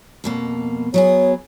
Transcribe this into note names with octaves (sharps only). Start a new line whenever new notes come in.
F2 B2 A#3
F#3 B3 G#4 C#5